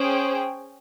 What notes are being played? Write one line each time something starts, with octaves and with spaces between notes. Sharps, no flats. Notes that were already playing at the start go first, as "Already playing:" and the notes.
Already playing: C#4 G#4 C5 G5